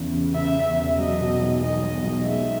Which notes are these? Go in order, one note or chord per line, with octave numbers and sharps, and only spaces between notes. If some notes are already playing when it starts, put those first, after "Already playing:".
Already playing: E2 C#3
C#3
C#3 E5
E2
E1
F#3 D#5
B2
B1
B1 D#5
B1
B1
G#3 E5